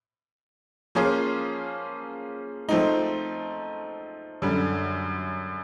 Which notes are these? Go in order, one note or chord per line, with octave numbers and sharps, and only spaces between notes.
F3 A#3 C#4 F4 G#4
F3 A3 C4 D#4
F#2 D3 G3